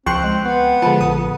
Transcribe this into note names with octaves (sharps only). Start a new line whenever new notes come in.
C#2 F3 C4 G5 C6 C#6 F#6
G#3
B3
D3 F3 G#3 A5 B5
A#1 D#6